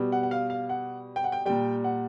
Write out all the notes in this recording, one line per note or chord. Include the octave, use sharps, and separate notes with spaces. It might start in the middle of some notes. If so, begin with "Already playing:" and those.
Already playing: B2 G3
F#5
F#5
F5
F5
F#5
G5
F#5
G5
A#2 G3 G5
F#5